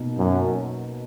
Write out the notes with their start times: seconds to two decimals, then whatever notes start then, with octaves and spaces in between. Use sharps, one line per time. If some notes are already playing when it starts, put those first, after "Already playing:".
Already playing: B2 A#3 D#4
0.18 F#2